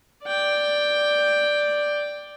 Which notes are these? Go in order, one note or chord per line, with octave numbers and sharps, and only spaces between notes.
D5 G5